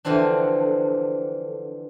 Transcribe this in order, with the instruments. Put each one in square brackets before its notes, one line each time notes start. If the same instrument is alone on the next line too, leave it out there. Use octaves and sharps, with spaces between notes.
[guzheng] D3 E3 F3 C4 D4